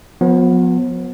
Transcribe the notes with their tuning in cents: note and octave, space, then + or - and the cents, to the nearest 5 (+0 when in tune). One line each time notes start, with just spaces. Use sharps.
F3 +45 B3 +0